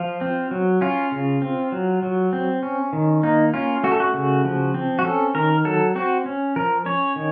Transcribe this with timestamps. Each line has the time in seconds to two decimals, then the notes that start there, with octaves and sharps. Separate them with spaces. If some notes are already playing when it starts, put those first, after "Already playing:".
Already playing: F3 F4
0.21 C4
0.51 F#3
0.81 C#4 F4
1.12 C#3
1.42 C4
1.72 F#3
2.03 F#3
2.33 C4
2.63 C#4
2.93 D#3
3.23 A#3 D#4
3.54 C#4 F4
3.83 A3 F#4
3.92 A4
4.00 F#4
4.14 C#3
4.45 F3
4.74 C4
4.99 F#4
5.05 C#4 A4
5.35 D#3 A#4
5.65 F#3 A4
5.95 C4 F#4
6.26 C#4
6.56 F3 A#4
6.86 C#4 C#5
7.16 D#3